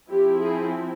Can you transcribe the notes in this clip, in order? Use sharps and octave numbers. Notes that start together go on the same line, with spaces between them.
F3 C4 E4 G4
G#4